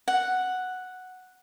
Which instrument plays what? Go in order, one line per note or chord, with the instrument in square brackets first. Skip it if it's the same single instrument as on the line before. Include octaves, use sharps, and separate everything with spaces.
[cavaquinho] F#5